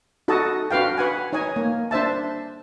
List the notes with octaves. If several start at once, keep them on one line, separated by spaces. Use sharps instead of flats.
D#4 F#4 A4 D#5 A5
D4 F#4 B4 F5 G5
B4 F#5 G#5
D#4 C#5 D#5 G#5
A#3
D4 C5 E5 A5